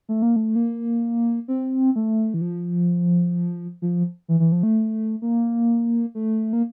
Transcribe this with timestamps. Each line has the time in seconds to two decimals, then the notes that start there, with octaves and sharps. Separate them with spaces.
0.09 A3
0.22 A#3
0.36 A3
0.55 A#3
1.48 C4
1.96 A3
2.34 E3
2.41 F3
3.82 F3
4.28 E3
4.40 E3
4.52 F3
4.63 A3
5.22 A#3
6.15 A3
6.53 A#3